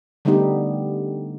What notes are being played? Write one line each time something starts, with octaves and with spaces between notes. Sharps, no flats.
D3 G3 A3 B3 D#4 G4